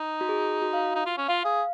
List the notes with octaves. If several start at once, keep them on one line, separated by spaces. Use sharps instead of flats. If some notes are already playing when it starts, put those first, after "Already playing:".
Already playing: D#4
F#4
G#4
F#4
F5
D#4
F4
C#4
F4 F5
G#4 F5